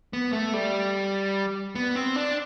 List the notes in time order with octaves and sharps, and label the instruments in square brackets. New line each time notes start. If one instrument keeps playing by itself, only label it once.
[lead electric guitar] B3
A3
G3
B3
C4
D4